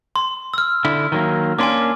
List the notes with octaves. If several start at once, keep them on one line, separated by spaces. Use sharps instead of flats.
C6
E6 F6
D3 E4
D#3 F#3 A#3
A#3 C#4 D4 G#5 C6 D6